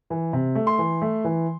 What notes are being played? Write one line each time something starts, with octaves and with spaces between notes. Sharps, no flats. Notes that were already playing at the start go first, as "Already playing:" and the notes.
E3
C3
A3
C6
E3
A3
E3